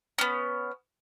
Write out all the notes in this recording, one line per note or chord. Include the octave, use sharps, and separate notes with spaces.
B3 C#4